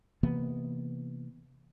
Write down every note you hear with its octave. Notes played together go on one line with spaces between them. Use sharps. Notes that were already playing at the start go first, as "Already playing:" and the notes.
C3 E3 A#3 B3